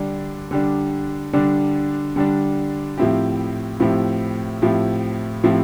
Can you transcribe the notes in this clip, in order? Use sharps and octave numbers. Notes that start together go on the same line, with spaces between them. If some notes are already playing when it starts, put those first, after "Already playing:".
Already playing: D3 G3 D4
D3 G3 D4
D3 G3 D4
D3 G3 D4
A2 F3 C4 E4 G4
A2 F3 C4 E4 G4
A2 F3 C4 E4 G4
A2 F3 C4 E4 G4